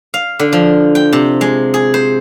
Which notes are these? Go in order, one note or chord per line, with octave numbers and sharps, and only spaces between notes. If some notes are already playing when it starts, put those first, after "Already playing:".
F5
D3
F3
G5
C3
G#3
G#4
C5